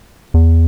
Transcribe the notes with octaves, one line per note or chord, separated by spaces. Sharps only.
E2